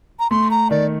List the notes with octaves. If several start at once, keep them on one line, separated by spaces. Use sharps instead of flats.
A#5
A3 C6
A#5
D#3 D5